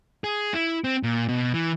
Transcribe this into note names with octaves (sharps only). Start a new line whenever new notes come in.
G#4
E4
C4
A#2
B2
E3